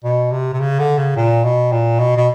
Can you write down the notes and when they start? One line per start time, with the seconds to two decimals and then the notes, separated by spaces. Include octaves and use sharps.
0.04 B2
0.32 C3
0.53 C3
0.60 C#3
0.79 D3
0.98 C#3
1.16 A#2
1.44 B2
1.72 A#2
2.00 B2
2.17 B2